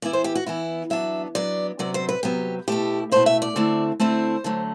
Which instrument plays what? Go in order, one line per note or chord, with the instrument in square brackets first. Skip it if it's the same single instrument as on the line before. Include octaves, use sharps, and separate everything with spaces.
[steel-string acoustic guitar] E3 B3 E4 D5
C5
G4
F#4
E3 B3 E4
F#3 B3 D4 E5
F#3 B3 D4 D5
C3 F#3 B3 D5
C5
B4
C3 F#3 B3 G4
B2 A3 E4 G4
B2 A3 E4 C5
E5
D5
D3 A3 C4 E4
D3 A3 C4 E4 C5
D3 F#3 A3